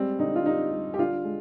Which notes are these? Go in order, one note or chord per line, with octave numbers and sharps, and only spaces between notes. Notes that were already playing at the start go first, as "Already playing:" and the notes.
Already playing: G3 G#3 C4
D3 D#4
F4
G3 D#4
G3
G4
D3 F4
G#3